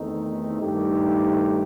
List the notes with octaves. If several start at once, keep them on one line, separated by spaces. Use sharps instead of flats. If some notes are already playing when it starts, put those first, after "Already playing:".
Already playing: E2 D#3 A3 C4 D#4
G2 D#3 A3 D#4 G4